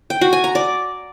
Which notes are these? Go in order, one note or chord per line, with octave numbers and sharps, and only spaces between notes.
G5
F#4
G#5
A#5
D5